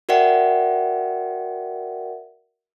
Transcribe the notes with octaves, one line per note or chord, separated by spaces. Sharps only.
F#4 A#4 D5 E5 F#5 G5